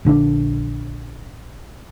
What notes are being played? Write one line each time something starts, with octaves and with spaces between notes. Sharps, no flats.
A#1 D3 C4 D4